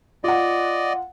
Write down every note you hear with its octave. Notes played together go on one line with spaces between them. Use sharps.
F4 D5 D#5 F#5